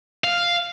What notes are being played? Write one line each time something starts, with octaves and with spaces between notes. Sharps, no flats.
F5